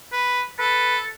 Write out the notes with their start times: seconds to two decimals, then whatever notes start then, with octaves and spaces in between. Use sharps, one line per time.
0.12 B4
0.59 A4 B4